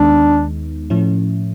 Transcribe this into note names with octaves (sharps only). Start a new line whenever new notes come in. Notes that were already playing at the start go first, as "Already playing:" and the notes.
Already playing: D#2 D#3 G#3 B3 D4 D#4
A2 F3 A3 C#4 E4